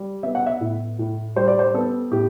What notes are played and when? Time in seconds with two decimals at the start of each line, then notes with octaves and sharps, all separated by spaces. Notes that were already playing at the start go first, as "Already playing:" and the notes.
Already playing: G3
0.23 B3 E5
0.35 F#5
0.46 E5
0.61 A2
0.99 A2
1.36 G3 C5
1.48 D5
1.59 C5
1.74 B3 A4
2.12 A2 G4